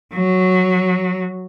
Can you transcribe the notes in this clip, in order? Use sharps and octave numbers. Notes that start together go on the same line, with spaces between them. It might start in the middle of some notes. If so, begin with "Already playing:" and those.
F#3